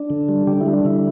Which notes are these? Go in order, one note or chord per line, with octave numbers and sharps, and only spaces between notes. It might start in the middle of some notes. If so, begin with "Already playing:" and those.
Already playing: D4
D3
G3
D3 G4
E4
G3
D4
D3 E4